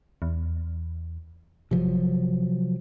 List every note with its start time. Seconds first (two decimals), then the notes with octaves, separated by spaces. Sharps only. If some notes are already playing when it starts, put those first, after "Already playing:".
0.22 E2
1.71 G1 C3 F3 F#3